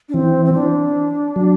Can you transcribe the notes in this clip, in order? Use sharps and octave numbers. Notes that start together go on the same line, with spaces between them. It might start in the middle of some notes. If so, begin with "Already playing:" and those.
D4
E3 C4
C4
D4
F#3